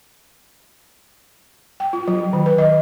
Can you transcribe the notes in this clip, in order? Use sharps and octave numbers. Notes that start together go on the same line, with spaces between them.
G5
F4
F#3
D#3
B4
D#5